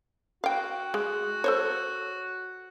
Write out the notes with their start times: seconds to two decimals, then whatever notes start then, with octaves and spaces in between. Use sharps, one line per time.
0.44 F#4 F5 G5
0.94 G#3
1.44 A4 C5 C#5